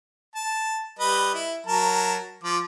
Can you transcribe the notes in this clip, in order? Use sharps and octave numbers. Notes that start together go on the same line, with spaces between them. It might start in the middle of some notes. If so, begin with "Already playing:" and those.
A5
G3 B4 D#5
E4
F#3 A#4 A5
F3 D6